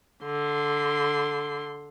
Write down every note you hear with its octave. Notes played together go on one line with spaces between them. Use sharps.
D3 C6